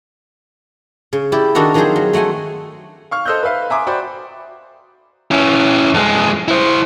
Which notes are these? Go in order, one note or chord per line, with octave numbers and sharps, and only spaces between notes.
C#3
E4 G4 D5
D#3 D4 D#4 F#4 A4
D#3 F3 F#3 C4 G#4 C5
F#3
F#3 A3 F#5 G#5 C6
F5 C#6 F6
A4 C5 D#5 E6 F#6 G6
B4 E5 F5
E5 G#5 A#5 C6 D6 D#6
F#4 C5 D5 G5 B5 D6
C#4 E4
F2 G#3
E4 C5